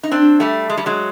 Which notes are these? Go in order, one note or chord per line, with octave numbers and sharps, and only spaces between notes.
D#4
C4 D4
G3 A3
G#3
G3
F#3 G#3